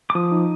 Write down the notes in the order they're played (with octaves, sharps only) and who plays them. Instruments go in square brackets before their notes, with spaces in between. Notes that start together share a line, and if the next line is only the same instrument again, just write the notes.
[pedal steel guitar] D6
[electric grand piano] F3 [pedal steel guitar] D#6
[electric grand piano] D#4